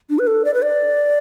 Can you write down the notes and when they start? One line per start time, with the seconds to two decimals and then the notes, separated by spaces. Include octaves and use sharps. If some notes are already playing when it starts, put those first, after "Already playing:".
0.10 D4
0.19 B4
0.27 A4
0.45 D5
0.54 B4
0.63 D5